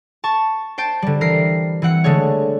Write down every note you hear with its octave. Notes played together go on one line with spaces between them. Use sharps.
A5 C#6
C5 G5 A5
D3 G3
E3 A#4 C7
E3 C4 F#5 C#7
D3 G#3 A3 C#5